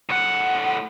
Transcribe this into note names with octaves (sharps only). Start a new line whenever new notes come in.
A2 F#5